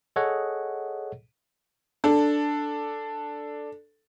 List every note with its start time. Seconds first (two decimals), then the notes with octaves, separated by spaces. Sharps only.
0.16 G#4 A4 C#5 D#5 F#5
2.04 D4 A4